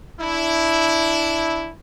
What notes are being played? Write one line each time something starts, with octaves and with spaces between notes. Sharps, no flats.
D4 E4